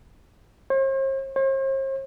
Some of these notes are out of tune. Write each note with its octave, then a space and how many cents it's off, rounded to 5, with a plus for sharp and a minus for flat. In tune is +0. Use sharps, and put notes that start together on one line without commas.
C5 +45
C5 +45